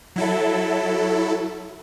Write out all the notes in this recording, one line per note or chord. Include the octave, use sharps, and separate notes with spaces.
F#3 E4 A4